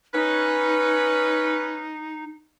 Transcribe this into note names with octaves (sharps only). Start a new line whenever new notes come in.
C#4 D#4 B4